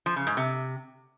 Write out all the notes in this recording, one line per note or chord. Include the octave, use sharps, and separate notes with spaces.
F3
C#3
G#2
C3